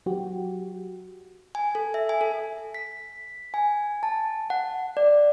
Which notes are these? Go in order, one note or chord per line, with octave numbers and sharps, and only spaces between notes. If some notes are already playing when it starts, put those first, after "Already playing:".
F#3 F#4 G4
G#5
A4
E5
G#5
A4
B6
G#5
A5
F#5
D5